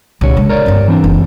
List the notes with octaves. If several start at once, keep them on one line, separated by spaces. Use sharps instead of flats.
C2 A#2 D3 C#5
C#3 G#3
A#4 C#5 D5
G2 B3
E3 C4 D4
F#1